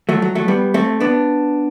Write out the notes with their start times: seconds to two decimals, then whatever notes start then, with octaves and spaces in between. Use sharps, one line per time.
0.09 F#3 A3
0.22 F#3
0.35 F#3 A3
0.48 G3 B3
0.74 A3 C4
1.00 B3 D4